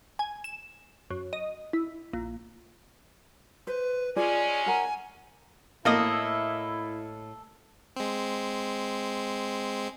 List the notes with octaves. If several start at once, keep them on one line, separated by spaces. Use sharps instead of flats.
G#5
E7
F#2
D#5
E4
A#1
B4 C5
G#3 C#4 F4 G#4 D5 G#5
A#4 F#5 A#5
A2 A#3 E4 A4 D#5 D#6
G#3 C4